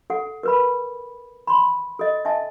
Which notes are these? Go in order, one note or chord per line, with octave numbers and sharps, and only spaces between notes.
A4 F#5
A#4 B4 B5
B5 C6
A4 D#5
D#5 E5 G#5 A5